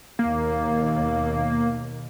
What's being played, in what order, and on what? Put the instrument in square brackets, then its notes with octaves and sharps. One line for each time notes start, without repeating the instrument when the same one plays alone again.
[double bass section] D#2 B2 [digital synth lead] A#3